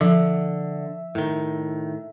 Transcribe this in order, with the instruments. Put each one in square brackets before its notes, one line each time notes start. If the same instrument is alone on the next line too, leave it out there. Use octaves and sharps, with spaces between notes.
[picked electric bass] D3 [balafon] F3 [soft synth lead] E5
[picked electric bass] A2 D#3